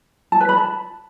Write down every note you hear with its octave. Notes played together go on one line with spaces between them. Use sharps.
A5
B4
B5
A5